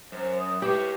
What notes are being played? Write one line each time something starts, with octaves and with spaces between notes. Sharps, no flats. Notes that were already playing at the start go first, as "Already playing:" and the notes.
F#2 C5
D#6
E4 G4 B4 C#5